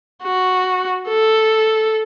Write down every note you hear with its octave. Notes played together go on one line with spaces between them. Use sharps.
F#4
A4